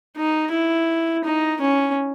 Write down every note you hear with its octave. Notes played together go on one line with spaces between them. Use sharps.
D#4
E4
D#4
C#4